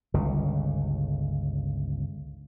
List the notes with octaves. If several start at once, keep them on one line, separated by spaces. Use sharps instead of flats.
G1 C#2 C#3